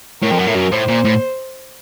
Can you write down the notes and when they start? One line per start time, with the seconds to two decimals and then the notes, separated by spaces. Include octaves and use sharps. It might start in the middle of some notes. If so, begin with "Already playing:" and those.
0.22 A2 A#4
0.31 F2
0.39 F#2
0.47 A2
0.55 F#2
0.72 A2 C5
0.88 A#2
1.04 A2